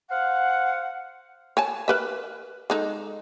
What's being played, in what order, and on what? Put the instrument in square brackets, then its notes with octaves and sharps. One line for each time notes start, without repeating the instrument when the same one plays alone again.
[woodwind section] C5 F5 F#5
[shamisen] C#5 G#5 A5
A#4 B4 E5
G#3 D#4 A4